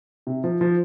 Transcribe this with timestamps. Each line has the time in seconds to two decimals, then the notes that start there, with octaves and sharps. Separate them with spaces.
0.27 C3
0.44 F3
0.61 F3